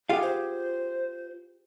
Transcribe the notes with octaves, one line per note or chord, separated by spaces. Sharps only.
F4 G4 G#4 F5 F#5
C5